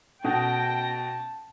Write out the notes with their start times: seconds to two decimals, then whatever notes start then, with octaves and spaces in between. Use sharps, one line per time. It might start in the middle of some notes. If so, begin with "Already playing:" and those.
0.24 B2 C#4 A4 F#5 G5 A5 A#6